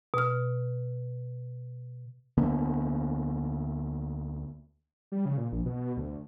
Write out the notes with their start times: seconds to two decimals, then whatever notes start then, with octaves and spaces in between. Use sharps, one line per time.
0.14 B2 F6
2.37 D2 D3 A#3 B3
5.12 G3
5.26 C#3
5.37 A#2
5.52 A#1
5.65 B2
5.97 D2